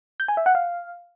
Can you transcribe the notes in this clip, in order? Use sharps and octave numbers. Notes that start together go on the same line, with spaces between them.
G6
G#5
E5
F#5
F5